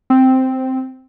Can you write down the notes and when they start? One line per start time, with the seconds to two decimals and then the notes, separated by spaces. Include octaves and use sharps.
0.10 C4